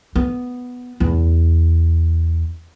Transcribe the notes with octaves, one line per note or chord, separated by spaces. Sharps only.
B3
E2